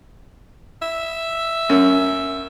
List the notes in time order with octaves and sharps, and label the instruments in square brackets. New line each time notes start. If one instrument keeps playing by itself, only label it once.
[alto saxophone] E5
[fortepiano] F#2